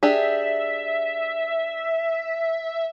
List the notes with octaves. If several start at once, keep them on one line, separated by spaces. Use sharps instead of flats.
D4 G4 G#4 E5